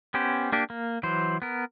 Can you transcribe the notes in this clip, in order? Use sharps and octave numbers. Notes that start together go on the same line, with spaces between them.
B3 C#4 G4 C5
A#3 D4 G4
A#3
E3 F#3 C5
B3 A#4